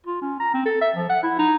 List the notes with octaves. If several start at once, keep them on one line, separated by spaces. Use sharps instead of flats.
F4
C#4
A#5
C4
A4
E5
F3
F#5
E4
D#4